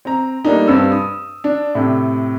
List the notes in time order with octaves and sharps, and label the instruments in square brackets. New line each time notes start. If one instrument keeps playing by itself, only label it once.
[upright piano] C4 A#5
G3 A3 A#3 D4 D#4
G2 C4 E6
D#6
D4
A2 C3